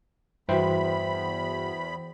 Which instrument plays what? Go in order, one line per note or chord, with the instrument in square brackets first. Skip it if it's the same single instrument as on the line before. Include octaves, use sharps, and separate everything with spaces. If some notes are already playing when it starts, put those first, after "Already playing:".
[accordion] E2 B5 [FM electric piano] G2 F#4 [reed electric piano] E3 C5 G5 [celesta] E5